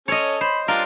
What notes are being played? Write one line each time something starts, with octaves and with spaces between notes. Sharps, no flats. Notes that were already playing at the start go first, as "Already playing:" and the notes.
C#4 A4 C#5 D#5
C5 B5
G3 D4 F4 A#4